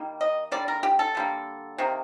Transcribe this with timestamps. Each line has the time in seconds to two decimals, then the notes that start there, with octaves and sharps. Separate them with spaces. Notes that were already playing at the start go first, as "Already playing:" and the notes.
Already playing: D#3 G3 A#3
0.21 D#5
0.52 D3 G3 A#3 D5
0.68 A#4
0.83 G4
0.99 A4
1.15 D3 G3 A#3
1.78 C3 D#3 A#3